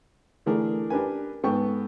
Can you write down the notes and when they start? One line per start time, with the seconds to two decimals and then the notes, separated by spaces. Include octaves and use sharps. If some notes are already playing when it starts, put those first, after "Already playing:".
0.46 D3 E3 A3 D4 G#4 A#4
0.90 D4 G4 A#4 B4 G#5
1.43 G#2 B3 A4 G5 C#6